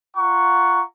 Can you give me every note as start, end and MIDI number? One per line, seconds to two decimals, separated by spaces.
0.16 0.82 65
0.16 0.82 78
0.16 0.82 82
0.16 0.82 85